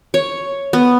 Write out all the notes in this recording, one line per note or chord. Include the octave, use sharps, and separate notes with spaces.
C#5
B3